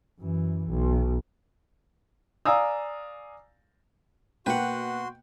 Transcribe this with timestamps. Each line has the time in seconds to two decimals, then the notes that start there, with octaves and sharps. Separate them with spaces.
0.19 F#2 E3
0.68 B1
2.45 D5 F5 G#5 A#5 D#6 E6
4.46 B2 A#3 F#4 B4 F#5 G5 C6